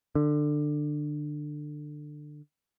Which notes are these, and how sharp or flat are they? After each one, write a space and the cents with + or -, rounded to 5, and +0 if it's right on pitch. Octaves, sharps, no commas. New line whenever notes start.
D3 +20